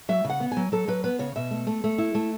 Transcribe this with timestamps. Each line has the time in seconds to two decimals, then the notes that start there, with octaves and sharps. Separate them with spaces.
0.09 F#3 E5
0.25 C#3
0.30 F#5
0.40 B3
0.52 G#5
0.57 F#3
0.72 F#3 A4
0.88 F#3 B4
1.04 B3 B4
1.19 C#3 C#5
1.36 B2 E5
1.51 A3
1.67 A3
1.84 A3
1.98 E4
2.15 A3